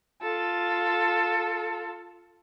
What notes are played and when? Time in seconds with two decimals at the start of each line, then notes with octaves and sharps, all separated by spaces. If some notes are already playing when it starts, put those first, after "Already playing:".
0.21 F4 A4